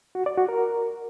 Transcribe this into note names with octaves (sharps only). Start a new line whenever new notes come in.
F#4
D5
F#4
A#4